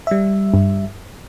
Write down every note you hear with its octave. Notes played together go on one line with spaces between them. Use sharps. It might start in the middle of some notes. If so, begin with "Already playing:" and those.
G3 E5
G2